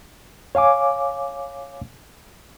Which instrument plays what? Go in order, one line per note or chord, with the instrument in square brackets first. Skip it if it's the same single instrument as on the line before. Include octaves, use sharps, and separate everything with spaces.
[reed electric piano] C#5 F5 G#5 D6